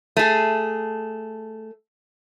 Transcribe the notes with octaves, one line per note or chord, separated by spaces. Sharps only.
A3 G#4